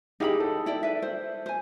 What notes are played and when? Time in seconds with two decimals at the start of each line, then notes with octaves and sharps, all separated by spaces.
0.20 D#4 E4 G4 G#4 F5 B5
0.40 A4
0.66 E4 D5 G5
0.83 B4 E5
1.02 C5
1.46 C5 G#5